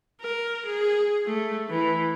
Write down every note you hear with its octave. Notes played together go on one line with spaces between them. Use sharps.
A#4
G#4
A3
E3